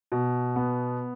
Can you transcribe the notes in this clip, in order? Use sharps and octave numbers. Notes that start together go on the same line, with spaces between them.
B2
B3